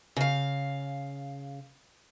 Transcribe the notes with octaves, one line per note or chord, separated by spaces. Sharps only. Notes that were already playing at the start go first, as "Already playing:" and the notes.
C#3 F5